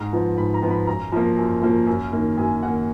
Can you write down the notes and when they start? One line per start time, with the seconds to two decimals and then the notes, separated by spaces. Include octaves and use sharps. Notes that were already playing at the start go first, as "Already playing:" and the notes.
Already playing: G#2 A#5
0.13 F3 B3
0.37 G#2 B5
0.54 A#5
0.62 F3 B3
0.70 B5
0.87 F#2 A#5
1.12 F3 A#3
1.37 F#2
1.62 F3 A#3
1.87 F#2
2.12 D#3 A#3
2.38 F#2 G#5
2.62 D#3 A#3 F#5